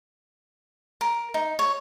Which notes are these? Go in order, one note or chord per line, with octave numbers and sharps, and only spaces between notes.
A#4
D#4
C#5